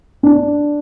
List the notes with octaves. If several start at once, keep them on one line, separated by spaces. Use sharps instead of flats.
D4